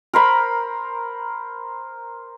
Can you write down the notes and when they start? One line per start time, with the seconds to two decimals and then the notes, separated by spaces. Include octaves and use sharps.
0.13 A#4 C5 B5